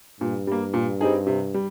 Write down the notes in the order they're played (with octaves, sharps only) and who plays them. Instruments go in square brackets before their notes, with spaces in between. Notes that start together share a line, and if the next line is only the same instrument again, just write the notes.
[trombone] G2 [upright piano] A#2
[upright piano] G3 A#3
A#2
G3 C4 D#4 G#4
C3
G3